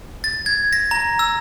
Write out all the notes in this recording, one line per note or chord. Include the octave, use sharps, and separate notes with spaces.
A6
G#6
A#6
A#5
E6